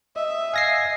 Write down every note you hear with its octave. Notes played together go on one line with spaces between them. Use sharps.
D#5 E5
F5 G#5 A#6 C7